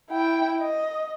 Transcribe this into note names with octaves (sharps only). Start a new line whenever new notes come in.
E4 G5
D#5